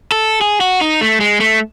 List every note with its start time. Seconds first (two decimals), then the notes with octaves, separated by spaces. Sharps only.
0.12 A4
0.41 G#4
0.61 F#4
0.81 D#4
1.01 A3
1.20 G#3
1.40 A3